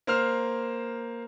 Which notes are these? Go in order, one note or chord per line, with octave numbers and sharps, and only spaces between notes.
A#3 C5 F6